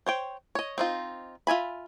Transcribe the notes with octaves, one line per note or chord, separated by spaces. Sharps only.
C5 C#5 G5
C#5 D#5
C4 D#4 F4
F4 E5 G#5 B5